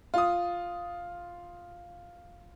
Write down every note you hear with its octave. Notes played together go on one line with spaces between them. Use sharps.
F4 D#6